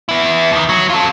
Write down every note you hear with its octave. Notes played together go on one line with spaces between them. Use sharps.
B3 E4
D#2 D#3
F#3
F4 A4